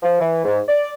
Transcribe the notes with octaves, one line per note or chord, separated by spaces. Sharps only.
F3
E3
G#2
D5